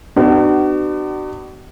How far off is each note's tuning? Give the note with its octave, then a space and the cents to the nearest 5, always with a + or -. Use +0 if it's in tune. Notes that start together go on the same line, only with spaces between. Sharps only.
B3 +30 D4 +45 F#4 +40